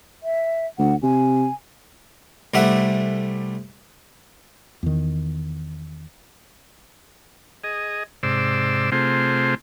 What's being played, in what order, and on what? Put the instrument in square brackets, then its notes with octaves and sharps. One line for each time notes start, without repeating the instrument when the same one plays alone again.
[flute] E5
[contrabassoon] D2 [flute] F#5
[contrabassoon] C3 [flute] G#5
[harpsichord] C2 G3 A3 E5 F#5
[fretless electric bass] E2 D#3
[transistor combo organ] G#4 D#5
G#2 C3 C5 D5 E6
C3 A3 C4 F4 G#4 C5